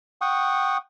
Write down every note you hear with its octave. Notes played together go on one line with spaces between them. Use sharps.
F#5 G5 C#6 D#6